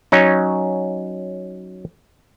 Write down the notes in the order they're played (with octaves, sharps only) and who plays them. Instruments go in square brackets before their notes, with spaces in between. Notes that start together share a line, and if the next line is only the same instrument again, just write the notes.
[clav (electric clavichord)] F#3 C#4 D#4